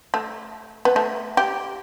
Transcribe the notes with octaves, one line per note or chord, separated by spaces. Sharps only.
A3
B3
A3
G4